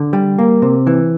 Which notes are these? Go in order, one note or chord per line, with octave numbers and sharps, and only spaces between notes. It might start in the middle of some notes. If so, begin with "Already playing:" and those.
Already playing: D3
G3
A#3
C3
E3